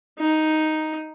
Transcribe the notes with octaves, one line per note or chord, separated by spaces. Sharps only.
D#4